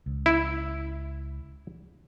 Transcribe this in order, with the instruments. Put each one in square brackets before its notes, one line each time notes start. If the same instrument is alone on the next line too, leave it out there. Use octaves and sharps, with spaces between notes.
[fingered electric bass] C#2
[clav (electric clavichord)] E4